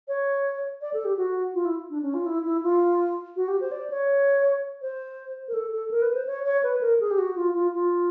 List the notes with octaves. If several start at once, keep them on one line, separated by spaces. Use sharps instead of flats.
C#5
D5
A4
G4
F#4
F4
E4
D4
C#4
F4
E4
E4
F4
F#4
G4
C5
D5
C#5
C5
A#4
A4
A4
A#4
B4
C5
C#5
C#5
B4
A#4
G#4
G4
F#4
F4
F4
F4